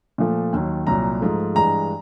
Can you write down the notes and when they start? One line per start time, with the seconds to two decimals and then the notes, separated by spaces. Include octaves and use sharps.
0.18 A#2 F3 A3
0.53 D#2 D#3 F#3
0.87 C2 A#2 F#3 A#5
1.21 G#2 F3 A3
1.55 G2 E3 G#3 A#5